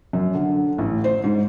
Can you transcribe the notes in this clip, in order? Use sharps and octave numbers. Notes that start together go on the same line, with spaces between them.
F#2
D3
A1
C5
G#2